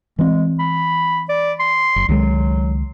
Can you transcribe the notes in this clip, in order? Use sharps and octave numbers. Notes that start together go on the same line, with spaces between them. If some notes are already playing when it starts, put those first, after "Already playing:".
E3 G#3 C4
B5
D5
C6
F#1
C#2 D#3 F#3 G#3